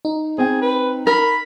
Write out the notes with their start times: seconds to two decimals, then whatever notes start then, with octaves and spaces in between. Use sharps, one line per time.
0.05 D#4
0.38 C4 G#4 G5
0.62 B4
1.07 A#4 B5